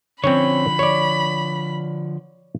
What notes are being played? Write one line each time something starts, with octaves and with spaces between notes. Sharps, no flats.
D3 F3 C4 C#4 C#5 B5
C#5 D5